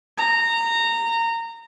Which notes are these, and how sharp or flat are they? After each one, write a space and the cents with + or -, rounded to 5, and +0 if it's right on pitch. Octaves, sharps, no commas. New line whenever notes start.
A#5 -20